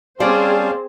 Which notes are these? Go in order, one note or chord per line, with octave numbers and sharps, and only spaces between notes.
G3 C4 C#4 G#4 C5 D5 F5 A5